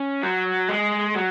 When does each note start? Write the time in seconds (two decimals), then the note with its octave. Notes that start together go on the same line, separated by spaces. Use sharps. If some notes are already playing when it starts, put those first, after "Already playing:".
Already playing: C#4
0.23 F#3
0.69 G#3
1.15 F#3